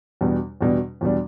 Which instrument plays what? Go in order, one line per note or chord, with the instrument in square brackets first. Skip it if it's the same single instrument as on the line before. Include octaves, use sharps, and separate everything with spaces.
[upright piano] E2 B2 G3 D4
E2 B2 G3 D4
E2 B2 G3 D4